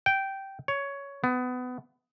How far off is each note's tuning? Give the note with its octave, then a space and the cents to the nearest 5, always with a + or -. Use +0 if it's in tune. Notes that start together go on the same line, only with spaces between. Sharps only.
G5 -10
C#5 +10
B3 +25